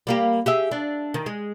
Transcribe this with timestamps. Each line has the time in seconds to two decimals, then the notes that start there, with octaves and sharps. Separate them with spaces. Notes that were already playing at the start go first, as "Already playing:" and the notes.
0.07 G3 A#3 G4
0.46 G4 G#4 E5
0.71 D4
1.14 D#3
1.26 G#3